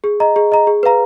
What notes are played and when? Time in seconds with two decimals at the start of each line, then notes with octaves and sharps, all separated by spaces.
0.04 G#4
0.20 D#5 A#5
0.36 G#4
0.52 D#5 A#5
0.67 G#4
0.83 B4 F5 A#5